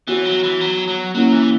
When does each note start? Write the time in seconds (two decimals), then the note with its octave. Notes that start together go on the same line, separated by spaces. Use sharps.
0.08 E3 B3 F#4 C#5
0.25 F#3
0.43 E3
0.61 F#3
0.88 F#3
1.15 F#3 A#3 C#4 E4
1.32 E3